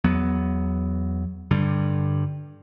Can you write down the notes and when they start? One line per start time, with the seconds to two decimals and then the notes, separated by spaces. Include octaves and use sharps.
0.04 E2 F#3 B3
1.51 G2 D3 G3